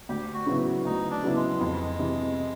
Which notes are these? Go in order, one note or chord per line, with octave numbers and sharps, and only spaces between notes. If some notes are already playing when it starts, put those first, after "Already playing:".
D2 G4
F#4
C#3 F#3 B3 E4
D2 D#4
D4
C#3 F#3 B3 E4
G#3
F2
C3 E3